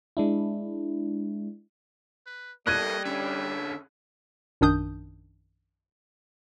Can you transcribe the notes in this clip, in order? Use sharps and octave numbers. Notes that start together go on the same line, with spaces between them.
G#3 D4 E4
B4
G3 A#3 A4 D#5 F#6 G#6 D#7
D3 C#4 E5
A#1 F#2 D#3 D4 D#6 G6